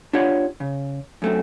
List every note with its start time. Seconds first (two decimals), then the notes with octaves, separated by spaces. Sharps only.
0.13 D4 F4 G4 C#5 F#5
0.60 C#3
1.22 F#2 A3 C4